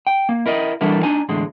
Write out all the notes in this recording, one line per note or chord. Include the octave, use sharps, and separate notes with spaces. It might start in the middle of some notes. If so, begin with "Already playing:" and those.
G5
A#3
E4 A#4 D#5
E3 G3 D4 E4 A4 A#4
D4 D#4 G#5
E2 A2 D3 G#3